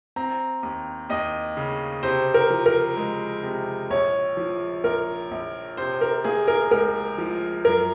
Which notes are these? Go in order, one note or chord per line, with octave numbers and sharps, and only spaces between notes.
C4 A#5
D#2
D#2 D#5
C#3
C3 C5
A#4
F3
A#4
G#3
C3
A#1 C#5
F3
A#1 A#4
A#1
C3 C5
A#4
A#3 G#4
A#4
C#2 A#4
F3
F#2 A#4